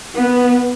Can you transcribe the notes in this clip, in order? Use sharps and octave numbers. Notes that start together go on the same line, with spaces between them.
B3